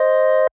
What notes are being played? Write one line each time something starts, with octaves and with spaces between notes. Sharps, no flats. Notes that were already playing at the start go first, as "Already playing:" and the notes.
Already playing: C5 D#5